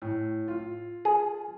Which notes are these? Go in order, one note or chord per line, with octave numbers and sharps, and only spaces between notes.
A2
F4
G#4